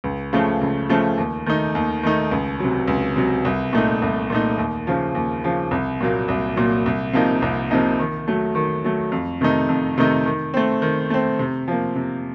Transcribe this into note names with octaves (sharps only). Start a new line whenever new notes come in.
C#2
C#3 F3 A3
C#2
C#3 F3 A3
D#2
D#3 A3 D#4
D#2
D#3 A3 D#4
C#2
C3 F#3
C#2
C3 F#3
C2
A#2 A3 D#4
C2
A#2 A3 D#4
D#2
C#3 F3
D#2
C#3 F3
C2
A#2 F#3 A#3
C2
A#2 F#3 A#3
C2
C3 F3 A#3 D#4
C2
C3 F3 A#3 D#4
D#3
F#3 A3
D#3
F#3 A3
F2
C3 D#3 A3 D#4
F2
C3 D#3 A3 D#4
D#3
A3 C4
D#3
A3 C4
C3
F3 A#3
C3